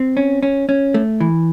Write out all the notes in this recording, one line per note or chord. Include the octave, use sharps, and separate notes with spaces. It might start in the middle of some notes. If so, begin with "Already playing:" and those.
Already playing: C4
C#4
C#4
C#4
A3
E3